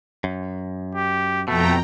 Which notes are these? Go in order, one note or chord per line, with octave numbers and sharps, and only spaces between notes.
F#2
G4
F2 B2 A3 G5 A#5